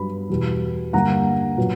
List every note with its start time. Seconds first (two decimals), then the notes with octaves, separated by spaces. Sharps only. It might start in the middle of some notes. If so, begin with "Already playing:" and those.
Already playing: G2 F#3 B3 B5
0.30 E2 B2 G3 B3
0.93 G2 D3 A#3 F#5 A#5
1.57 A#2 F#3 B3